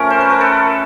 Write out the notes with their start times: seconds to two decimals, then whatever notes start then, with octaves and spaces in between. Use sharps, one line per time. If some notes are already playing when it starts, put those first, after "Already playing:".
Already playing: F3 A3 C#4 A#4
0.10 C5
0.20 B4
0.30 A#4
0.40 A4 B4